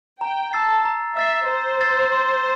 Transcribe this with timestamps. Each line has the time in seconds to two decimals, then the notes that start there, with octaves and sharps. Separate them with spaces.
0.21 G5 A#5
0.53 A5 E6 A6 C7
0.85 A#5
1.17 E5 E6 A6 C7
1.48 C5 A#5
1.81 E6 A6 C7
2.12 C6